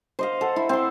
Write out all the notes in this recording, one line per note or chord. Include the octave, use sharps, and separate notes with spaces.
C5 D#5 F5
A4 F#5
E4
C4 C6